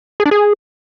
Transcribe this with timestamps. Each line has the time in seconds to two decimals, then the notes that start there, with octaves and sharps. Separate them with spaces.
0.20 G#4
0.26 D4
0.31 G#4